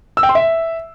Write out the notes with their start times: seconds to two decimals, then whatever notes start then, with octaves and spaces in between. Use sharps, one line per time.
0.17 E6
0.23 G5
0.29 C6
0.35 E5